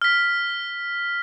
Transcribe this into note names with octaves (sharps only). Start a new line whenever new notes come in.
F6 B6